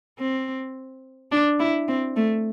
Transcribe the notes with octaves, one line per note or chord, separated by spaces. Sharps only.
C4
D4
E4
C4
A3